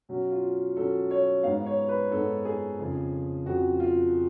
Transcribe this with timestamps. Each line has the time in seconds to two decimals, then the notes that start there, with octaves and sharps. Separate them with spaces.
0.09 B2 F#3 C#4
0.32 F4
0.76 B2 F#3 C#4 A4
1.11 C#5
1.43 G#2 G#3 B3 F5
1.66 C#5
1.89 B4
2.11 G#2 G#3 B3 A4
2.45 G#4
2.79 F2 C#3 F3
3.46 F2 C#3 F3 F#4
3.80 F4